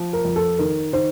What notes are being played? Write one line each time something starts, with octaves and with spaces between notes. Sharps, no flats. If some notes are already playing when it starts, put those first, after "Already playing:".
Already playing: F3
A#4
F2
A4
D#3 A#4
D#3 C5